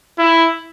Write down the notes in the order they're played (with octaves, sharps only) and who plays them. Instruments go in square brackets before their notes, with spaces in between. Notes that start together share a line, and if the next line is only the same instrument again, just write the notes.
[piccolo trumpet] E4